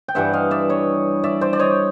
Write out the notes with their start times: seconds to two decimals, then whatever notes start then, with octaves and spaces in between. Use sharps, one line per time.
0.08 G5
0.15 G2 E3 G3 E5 F#5
0.33 D#5 F5
0.51 D5 E5
0.69 C#5 D#5
1.24 D5 E5
1.41 C5 D5
1.53 D5
1.59 C#5 D#5